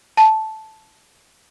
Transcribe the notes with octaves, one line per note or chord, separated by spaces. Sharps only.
A5